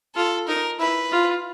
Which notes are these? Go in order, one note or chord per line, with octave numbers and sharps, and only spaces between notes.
F4 A4
D#4 A#4
E4 B4
F4